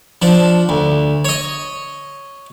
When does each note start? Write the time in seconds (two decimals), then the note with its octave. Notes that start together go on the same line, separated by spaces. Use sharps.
0.22 F3 D4
0.69 D2
1.25 C#5 D#5